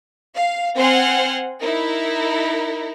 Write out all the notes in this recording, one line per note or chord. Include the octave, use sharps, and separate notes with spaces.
F5
C4 C5 F#5 G#5 C6 F6
D#4 E4 A#4